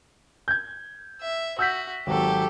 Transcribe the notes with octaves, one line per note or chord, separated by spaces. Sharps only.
G6 G#6
E5
F#4 E6 G6 B6
G#1 F#3 G4 A4